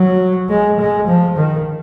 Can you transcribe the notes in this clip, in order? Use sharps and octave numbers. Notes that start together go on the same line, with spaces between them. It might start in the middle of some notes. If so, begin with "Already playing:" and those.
Already playing: F#3
G#3
G#3
F3
D#3